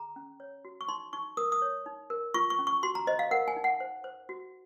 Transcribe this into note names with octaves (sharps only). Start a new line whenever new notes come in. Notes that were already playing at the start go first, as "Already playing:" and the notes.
Already playing: G#4 A#5
C#4
C#5
F#4
C#6
D#4 C6
D#4 C#6
A#4 D#6
D#6
C#5
D#4
A#4
F4 C#6
C#6
C#4
C#6
F#4 C6
A#5
C5 D#5
F5
A#4 F#5
G#5
D#4
F#5
C5
C5
F#4